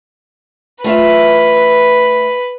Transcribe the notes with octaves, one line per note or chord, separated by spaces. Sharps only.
A3 F4 B4 E5